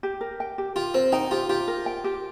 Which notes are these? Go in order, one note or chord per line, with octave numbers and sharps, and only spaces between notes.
G4
A#4
G5
G4
F4 G4
C4 A#4
D#4 G5
F4 G4
F4 G4
A#4
G5
G4